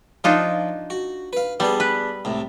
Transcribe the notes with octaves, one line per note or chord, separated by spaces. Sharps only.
F3 D4 D#4 F4
F#4
B4 F5
G3 B3 D4 G#4
B4
C2 A2